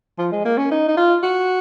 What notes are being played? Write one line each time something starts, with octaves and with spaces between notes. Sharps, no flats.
F3
G#3
A#3
C#4
D#4
D#4
F4
F#4